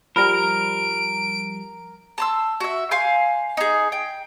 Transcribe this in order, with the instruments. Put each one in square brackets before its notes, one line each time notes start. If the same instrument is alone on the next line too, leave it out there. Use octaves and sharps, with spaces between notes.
[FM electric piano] F3 G3 [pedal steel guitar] A#4 [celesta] B5 F6 A#6 [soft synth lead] D7
[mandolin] A5 C6 E6
F#4 E5
F5 G#5 C6 G6
D#4 G#4
G5